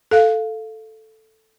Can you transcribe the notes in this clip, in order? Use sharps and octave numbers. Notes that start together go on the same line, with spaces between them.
A4 F5